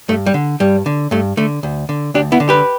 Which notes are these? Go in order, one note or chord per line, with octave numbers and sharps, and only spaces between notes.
G2 A3
G3
D3
G2 G3
D3
G2 A3
D3 A3
D2
D3
D2 D4 G4
B3 E4
D3
G4 B4